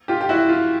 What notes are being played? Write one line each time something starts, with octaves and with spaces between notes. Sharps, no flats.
F4 G4
G4
E4 F#4
F4